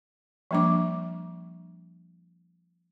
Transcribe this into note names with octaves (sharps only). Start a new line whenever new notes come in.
F3 G3 A#3 D4 D6